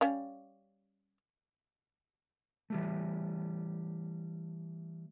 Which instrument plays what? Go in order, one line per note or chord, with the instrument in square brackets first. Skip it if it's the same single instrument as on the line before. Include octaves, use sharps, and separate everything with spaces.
[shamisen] G3 C#4 F5
[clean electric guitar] E3 G3 A3